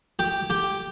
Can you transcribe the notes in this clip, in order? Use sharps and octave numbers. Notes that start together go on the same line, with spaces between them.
G4
G4